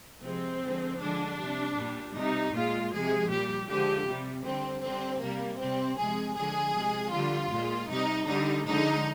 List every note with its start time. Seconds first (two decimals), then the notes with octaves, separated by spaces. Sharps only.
0.23 C3 F3 G#3 C4
0.62 D3 F3 G#3
1.00 D3 F3 G#3 D4
1.38 C3 G3
1.76 A#2 G3
2.14 C3 G3 D#4
2.53 A#2 G#3 F4
2.92 C3 F3 G#3 G#4
3.29 A#2 G3 G4
3.68 D3 F3 G#3 G4
4.07 C3 G3
4.44 D3 G3 C4
4.82 D3 G3 C4
5.21 C3 G3 A#3
5.59 C3 G3 C4
5.97 C3 F3 G#3 G#4
6.36 D3 F3 G#3 G#4
6.74 C3 F3 G#3
7.12 D3 G3 F4
7.51 A#2 G#3
7.89 C3 G3 D#4
8.27 D3 G3 D#4
8.66 D3 F3 G#3 D#4